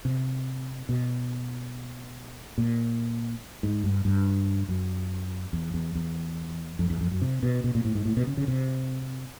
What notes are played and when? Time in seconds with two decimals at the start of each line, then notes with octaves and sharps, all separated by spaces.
0.05 C3
0.89 B2
2.58 A#2
3.63 G#2
3.84 G2
4.05 G2
4.68 F#2
5.53 E2
5.74 E2
5.95 E2
6.79 F2
6.90 E2
7.01 F2
7.12 F#2
7.22 C3
7.43 B2
7.64 B2
7.75 A#2
7.85 A2
7.95 G#2
8.05 A2
8.17 B2
8.27 C#3
8.37 C#3
8.48 C3